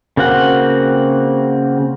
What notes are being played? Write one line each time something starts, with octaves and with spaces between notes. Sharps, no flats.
C#3 A#3 C4 F#4 F#5